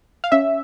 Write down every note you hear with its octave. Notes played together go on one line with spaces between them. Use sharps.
F5
C#4 E5